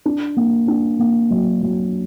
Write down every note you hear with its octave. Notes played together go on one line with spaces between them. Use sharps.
D4
A#3
D4
A#3
F#3
F#3